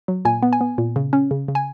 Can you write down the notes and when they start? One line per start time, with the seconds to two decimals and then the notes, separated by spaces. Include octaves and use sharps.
0.08 F#3
0.25 A#2 G#5
0.43 B3
0.53 G#5
0.61 B3
0.78 A#2
0.96 C#3
1.13 C#4
1.31 C#3
1.48 C#3
1.55 G#5